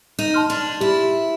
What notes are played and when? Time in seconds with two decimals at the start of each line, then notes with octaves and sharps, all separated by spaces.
0.19 D#4
0.34 A5 C6 F6
0.50 D4
0.80 E4 G4